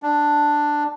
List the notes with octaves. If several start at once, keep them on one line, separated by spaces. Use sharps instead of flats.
D4